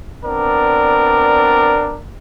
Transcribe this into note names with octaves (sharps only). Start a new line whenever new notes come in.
B3 C4 D4 A#4 D5